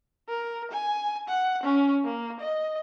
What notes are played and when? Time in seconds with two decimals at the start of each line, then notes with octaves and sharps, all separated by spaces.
0.28 A#4
0.71 G#5
1.28 F#5
1.63 C#4
2.04 A#3
2.40 D#5